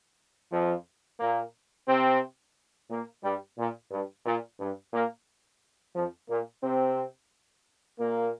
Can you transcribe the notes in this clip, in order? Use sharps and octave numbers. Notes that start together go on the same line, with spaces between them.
F2 F3
A#2 A#3
C3 C4
A#2 A#3
G2 G3
A#2
G2
A#2
G2
A#2 A#3
F2 F3
A#2 A#3
C3 C4
A#2 A#3